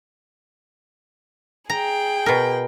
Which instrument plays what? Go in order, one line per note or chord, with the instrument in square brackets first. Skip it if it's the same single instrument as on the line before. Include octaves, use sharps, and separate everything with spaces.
[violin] G#4 G5 [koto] A#5
[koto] B2 A#4